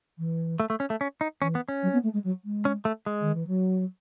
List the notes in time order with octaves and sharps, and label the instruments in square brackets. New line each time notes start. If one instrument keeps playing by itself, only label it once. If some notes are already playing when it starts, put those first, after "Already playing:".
[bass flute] E3
[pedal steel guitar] A3
A3
C#4
A3
C#4
D#4
[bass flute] E3 [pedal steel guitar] C#4
[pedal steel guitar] B3
C#4
[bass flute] F#3
B3
A3
G#3
F#3
G#3
[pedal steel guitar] C#4
A3
G#3
[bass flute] D#3
E3
F#3